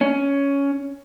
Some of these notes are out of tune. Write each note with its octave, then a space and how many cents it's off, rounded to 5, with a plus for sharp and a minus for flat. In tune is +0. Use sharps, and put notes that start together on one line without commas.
C#4 +10